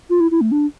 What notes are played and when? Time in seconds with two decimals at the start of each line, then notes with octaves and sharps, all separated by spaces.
0.10 F4
0.20 E4
0.31 E4
0.41 A3
0.52 D4